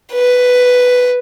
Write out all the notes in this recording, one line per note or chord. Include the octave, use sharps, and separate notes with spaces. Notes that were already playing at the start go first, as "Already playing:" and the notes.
B4